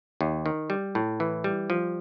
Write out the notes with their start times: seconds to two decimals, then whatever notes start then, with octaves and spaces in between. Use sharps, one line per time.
0.21 D#2
0.46 D#3
0.70 G3
0.95 A2
1.20 E3
1.44 G3
1.70 F3